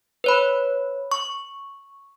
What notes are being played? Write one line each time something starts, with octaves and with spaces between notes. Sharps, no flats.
B4 C#5 B5
C#6